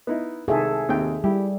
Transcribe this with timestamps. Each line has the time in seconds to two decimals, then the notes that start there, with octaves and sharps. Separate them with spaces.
0.07 B3 D#4 E4
0.48 C2 D#3 G#4 A4 E5
0.89 D#2 C3 G5
1.24 G3 E4 G4